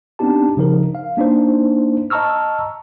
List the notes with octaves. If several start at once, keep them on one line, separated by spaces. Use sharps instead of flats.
B3 C4 D4 D#4 G4 A5
C#3 F3 D#4 A#4
F5
A#3 D4 D#4 C5
D#5 A5 A#5 C#6 E6 F6